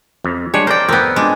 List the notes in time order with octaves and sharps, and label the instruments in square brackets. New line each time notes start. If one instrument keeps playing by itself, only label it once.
[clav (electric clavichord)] F2
[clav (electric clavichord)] G3 G#3 D4 [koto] C#5
[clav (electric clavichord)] A#4 D5 [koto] C5 G5
[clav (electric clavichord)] F2 A#4 G5 [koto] B3 C4
[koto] G#3 D4